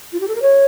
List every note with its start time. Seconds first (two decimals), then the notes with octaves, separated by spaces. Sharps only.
0.12 F4
0.20 G4
0.27 A4
0.34 A#4
0.41 C#5